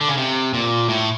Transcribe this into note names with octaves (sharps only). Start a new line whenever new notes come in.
D3
C#3
C3
A#2
A2